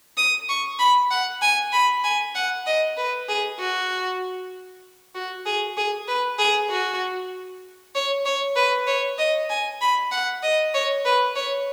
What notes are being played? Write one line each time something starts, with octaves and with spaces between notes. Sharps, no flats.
D#6
C#6
B5
F#5
G#5
B5
G#5
F#5
D#5
B4
G#4
F#4
F#4
G#4
G#4
B4
G#4
F#4
C#5
C#5
B4
C#5
D#5
G#5
B5
F#5
D#5
C#5
B4
C#5